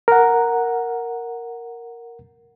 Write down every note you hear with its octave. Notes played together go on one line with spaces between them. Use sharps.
A#4 F#5